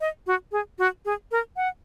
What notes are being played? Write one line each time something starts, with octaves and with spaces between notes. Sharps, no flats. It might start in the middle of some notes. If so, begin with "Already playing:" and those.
D#5
F#4
G#4
F#4
G#4
A#4
F#5